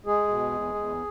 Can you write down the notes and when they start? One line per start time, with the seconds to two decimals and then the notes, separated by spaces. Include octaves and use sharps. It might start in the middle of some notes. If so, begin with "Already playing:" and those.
0.06 G#3 G#4
0.28 B2
0.51 E2
0.74 E2